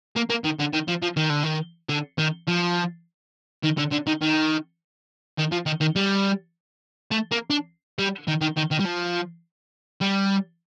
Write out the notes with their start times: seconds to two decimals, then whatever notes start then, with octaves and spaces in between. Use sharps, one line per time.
0.16 A#3
0.30 A#3
0.44 D#3
0.60 D3
0.73 D#3
0.88 F3
1.02 F3
1.17 D#3
1.30 D3
1.43 D#3
1.89 D3
2.18 D#3
2.47 F3
3.64 D#3
3.78 D3
3.92 D3
4.07 D#3
4.21 D#3
5.38 D#3
5.52 F3
5.66 D#3
5.81 D#3
5.96 G3
7.11 A3
7.31 A#3
7.50 D4
7.99 G3
8.28 D#3
8.41 D#3
8.57 D#3
8.72 D#3
8.80 G3
8.85 F3
10.01 G3